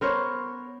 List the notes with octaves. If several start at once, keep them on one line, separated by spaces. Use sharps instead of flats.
B3 A#4 C5 C#5